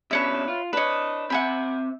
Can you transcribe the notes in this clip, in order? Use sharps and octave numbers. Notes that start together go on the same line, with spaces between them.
B2 C#4 D4 B4 C#5 E5
F4
D4 B4 C#5 D#5
C4 E5 F#5 G#5 B5